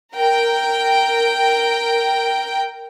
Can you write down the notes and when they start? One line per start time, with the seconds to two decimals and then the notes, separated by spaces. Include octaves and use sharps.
0.15 A#4 G5